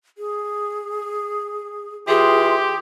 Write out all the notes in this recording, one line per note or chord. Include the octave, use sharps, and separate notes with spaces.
G#4
E3 F4 G4 G#4 C6